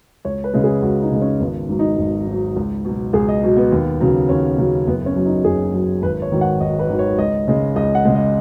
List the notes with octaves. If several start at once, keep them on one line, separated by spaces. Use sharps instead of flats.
C#2 C#5
B4
C#3 G#3
G#4
C#2 F#4
D#4
C#3 G#3
C#4
G#1 B3
G#2 F#3
D#4
G#1
G#2 F#3
C#2
B2 F#3
C#2 G#4
D#5
B2 F#3
B3
D#2 B3
C#3 F#3
D#2 C#4
C#3 F#3
F#1 B3
C#4
F#2 F#3
D#4
F#1 G#4
F#2 F#3
G#1 B4
C#5
G#2 D#3 F#3
F#5
G#1 D#5
B4
G#2 D#3 F#3
C#5
C#2 D#5
C#3 G#3
C#2 D#5
F#5
C#3 G#3
D#5